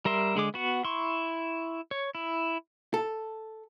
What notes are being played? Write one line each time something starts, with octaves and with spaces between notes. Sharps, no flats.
G3 A#4 E5 C6
D3 G#3 G#4 D6
B3 F#4 F#5
E4 C6 C#6
C#5
E4
A4